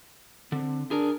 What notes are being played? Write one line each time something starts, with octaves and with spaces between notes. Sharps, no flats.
D3 C4
D4 G#4 A#4